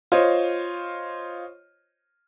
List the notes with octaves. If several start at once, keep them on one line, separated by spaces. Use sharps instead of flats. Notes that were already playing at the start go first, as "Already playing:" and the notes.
F4 C5 C#5 D#5